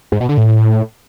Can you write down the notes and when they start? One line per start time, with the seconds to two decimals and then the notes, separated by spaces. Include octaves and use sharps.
0.12 G#2
0.20 B2
0.29 D3
0.37 A2